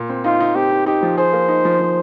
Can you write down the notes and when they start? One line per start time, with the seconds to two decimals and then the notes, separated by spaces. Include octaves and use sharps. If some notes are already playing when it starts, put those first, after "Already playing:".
Already playing: A#2
0.09 C4
0.25 D#4 F4
0.40 D#4
0.55 C4 G4
0.71 D#4
0.86 D#4 G4
1.03 F3
1.17 G#4 C5
1.33 A#3
1.48 D#4
1.65 F3
1.80 F3